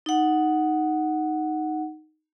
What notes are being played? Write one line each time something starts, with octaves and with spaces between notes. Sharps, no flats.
D#4 F#5